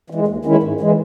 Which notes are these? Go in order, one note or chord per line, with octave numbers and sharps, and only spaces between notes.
E3 G#3
D#2
D#3 G#3 C#4 E4
G#2
E3 G#3